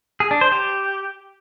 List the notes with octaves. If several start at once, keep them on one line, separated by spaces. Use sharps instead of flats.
G#4
D4
C5
G4